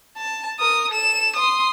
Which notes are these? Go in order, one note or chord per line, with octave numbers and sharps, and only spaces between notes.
A5
A#4 D#6
A4 E7
C6 D#6